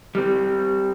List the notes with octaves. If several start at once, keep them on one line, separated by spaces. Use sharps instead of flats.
G3 C4